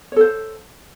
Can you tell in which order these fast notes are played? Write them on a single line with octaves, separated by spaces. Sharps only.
C#5 A4 C5